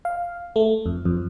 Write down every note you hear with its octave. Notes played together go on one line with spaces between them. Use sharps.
F5
A3
F2
F2